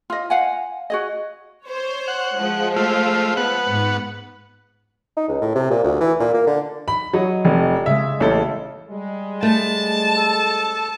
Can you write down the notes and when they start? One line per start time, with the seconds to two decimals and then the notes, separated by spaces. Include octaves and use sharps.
0.10 F4 D#5
0.30 F5 F#5 G#5
0.90 F#4 G#4 D#5
1.66 C5 C#5
2.08 F#5
2.37 F3 G#3
2.76 A3 F4
3.37 B3 F#5
3.68 G#2
5.16 D#4
5.28 C#2
5.41 A2
5.55 C3
5.71 A#2
5.84 D2
6.00 E3
6.19 A#2
6.34 A#3
6.46 D3
6.88 B5
7.14 F#3 C#5 D#5 C#7
7.45 F1 F2
7.86 C#3 G#3 E5
8.20 A1 A3 A#3 E4 A4
8.90 G3 G#3
9.43 A3 A5
10.16 A4